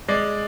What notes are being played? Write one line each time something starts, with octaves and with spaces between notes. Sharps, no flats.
G#3 D5